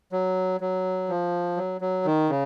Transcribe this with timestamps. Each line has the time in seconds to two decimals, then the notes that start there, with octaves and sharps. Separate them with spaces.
0.12 F#3
0.61 F#3
1.09 F3
1.57 F#3
1.81 F#3
2.05 D#3
2.30 C#3